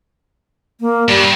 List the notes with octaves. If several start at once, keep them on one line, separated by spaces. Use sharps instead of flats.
A#3
G2 G3